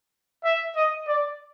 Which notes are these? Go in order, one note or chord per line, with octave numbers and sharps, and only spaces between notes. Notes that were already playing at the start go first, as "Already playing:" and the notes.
E5
D#5
D5